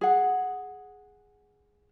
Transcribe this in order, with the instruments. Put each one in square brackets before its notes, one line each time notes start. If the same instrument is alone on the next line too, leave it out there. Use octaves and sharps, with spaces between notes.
[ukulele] G#4 F#5